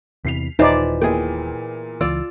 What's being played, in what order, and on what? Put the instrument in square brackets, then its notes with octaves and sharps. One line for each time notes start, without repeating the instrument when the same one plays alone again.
[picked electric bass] E2 C3 E3 [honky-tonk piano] B6 C7 F7
[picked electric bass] D#1 [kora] E3 F4 C5 [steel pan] D#4 D5
[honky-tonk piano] A#2 B3 E4 [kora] G#4 G5
[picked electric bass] C#2 E3 [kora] F4 D5 [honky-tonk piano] E6